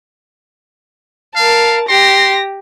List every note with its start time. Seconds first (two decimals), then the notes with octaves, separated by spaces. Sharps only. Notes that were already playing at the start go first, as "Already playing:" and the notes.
1.36 A#4 F5 A5
1.89 G4 C6 A#6